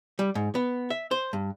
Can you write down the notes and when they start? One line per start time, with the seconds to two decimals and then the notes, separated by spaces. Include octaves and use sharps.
0.19 G3
0.35 G#2
0.55 B3
0.90 E5
1.11 C5
1.33 G2